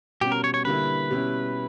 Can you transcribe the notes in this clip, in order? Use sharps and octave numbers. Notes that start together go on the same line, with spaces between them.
B2 G3 C#4 F#4 G4
A#4
C#5
C#5
D3 G3 A#3 E4 B4
B2 G3 C#4 E4